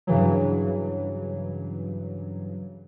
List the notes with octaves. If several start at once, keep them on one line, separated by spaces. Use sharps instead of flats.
G2 C#3 E3 F#3